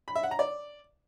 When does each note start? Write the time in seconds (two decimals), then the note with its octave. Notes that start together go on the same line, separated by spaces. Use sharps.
0.08 B5
0.16 E5
0.23 F#5
0.31 A#5
0.39 D5